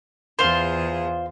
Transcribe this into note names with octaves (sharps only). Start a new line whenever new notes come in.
E2 F4 G#4 C5